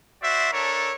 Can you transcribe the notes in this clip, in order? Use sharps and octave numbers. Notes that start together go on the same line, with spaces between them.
F#4 C5 D5 E5
D4 A4 A#4 C#5